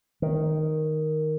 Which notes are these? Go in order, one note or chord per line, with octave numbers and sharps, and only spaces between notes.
D#3